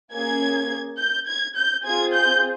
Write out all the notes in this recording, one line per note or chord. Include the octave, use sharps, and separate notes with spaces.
A#3 C#4 G#4 G#6
G6
G#6
G6
C4 F4 G#4 G#6
G6